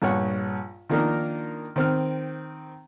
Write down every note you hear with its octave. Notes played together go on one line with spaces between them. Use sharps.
A#1 G2 C#5 F#5
D#3 F3 A#3 D4 D#4 A#4
D#3 C4 F6